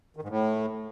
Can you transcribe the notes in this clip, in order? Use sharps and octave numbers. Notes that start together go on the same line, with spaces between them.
D#3
G#2
A2